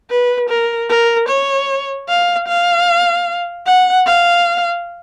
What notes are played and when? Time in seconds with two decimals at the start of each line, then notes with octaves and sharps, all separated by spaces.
0.10 B4
0.49 A#4
0.89 A#4
1.29 C#5
2.09 F5
2.48 F5
3.66 F#5
4.06 F5